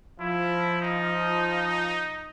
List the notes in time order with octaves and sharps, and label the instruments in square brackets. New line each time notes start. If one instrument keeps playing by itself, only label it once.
[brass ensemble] F3 [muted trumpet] E4
[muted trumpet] D#4